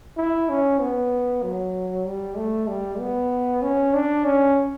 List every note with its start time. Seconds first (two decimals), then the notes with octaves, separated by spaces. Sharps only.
0.17 E4
0.49 C#4
0.81 B3
1.43 F#3
2.06 G3
2.37 A3
2.68 G3
2.99 B3
3.62 C#4
3.93 D4
4.25 C#4